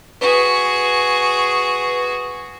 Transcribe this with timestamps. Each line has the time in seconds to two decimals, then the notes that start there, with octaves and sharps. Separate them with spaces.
0.21 F#4 G#4 B4